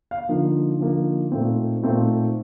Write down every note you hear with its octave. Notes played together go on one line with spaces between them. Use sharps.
F5
D3 F3 A#3 D#4
D3 F3 A#3 D#4
A#2 A3 C4 D#4
A#2 A3 C4 D#4